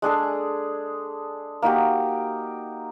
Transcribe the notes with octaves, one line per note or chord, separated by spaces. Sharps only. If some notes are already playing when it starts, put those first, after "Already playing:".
G#3 D4 G#4 A4
A#3 D#4 F#4 G4